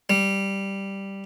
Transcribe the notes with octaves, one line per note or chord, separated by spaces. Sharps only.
G3